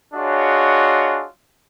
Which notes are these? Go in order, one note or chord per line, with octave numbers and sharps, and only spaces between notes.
D4 F4 F#4 G#4 C#5 D#5